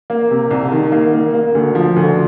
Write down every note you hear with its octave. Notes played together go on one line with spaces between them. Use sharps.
A#3
C3
C2
D#3
A#3
A#3
A#3
D2
F3
D2